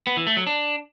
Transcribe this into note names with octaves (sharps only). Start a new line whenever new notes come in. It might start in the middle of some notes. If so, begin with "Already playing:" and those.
B3
E3
A3
F#3
D4